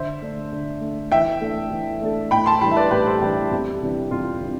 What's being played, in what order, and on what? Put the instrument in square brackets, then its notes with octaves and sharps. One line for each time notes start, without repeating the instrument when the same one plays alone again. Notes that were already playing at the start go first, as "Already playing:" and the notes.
Already playing: [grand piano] D3 [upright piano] C5 E5
[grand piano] A3 D4
D3
A3 D4
[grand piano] E3 [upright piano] E5 G5
[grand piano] A3 D4 A4
E3
A3 D4 A4
[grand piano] A2 [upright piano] G5 B5
[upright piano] A5 C6
[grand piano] E3 G3 D4 [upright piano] G5 B5
[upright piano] E5
B4 D5
[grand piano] A2 [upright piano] G4 B4
[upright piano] A4 C5
[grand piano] E3 G3 D4 [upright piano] G4 B4
[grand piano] F2 [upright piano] G4
[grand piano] C3 E3 G3 D4
[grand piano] F2 [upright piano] F4
[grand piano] C3 E3 G3 D4